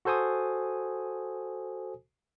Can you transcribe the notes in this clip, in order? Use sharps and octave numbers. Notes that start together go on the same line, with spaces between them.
F#4 A4 C5 G#5 D#6